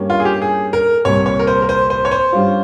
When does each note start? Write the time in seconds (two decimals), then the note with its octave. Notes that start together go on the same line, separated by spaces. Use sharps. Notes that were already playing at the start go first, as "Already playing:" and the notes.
Already playing: G2 G3 A#3 C#4
0.10 F4
0.20 G#4
0.25 G4
0.42 G#4
0.73 A#4
1.05 C2 A#2 G3 C#5
1.26 C#5
1.39 A#4
1.47 C5
1.62 A#4
1.69 C5
1.90 C5
2.05 C#5
2.11 C5
2.32 G2 G3 C#4 F4